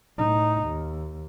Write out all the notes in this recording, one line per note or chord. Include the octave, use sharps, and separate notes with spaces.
A2 D#4
D#2